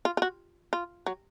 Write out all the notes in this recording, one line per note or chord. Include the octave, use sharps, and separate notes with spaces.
F4
F4
F#4
F4
F#3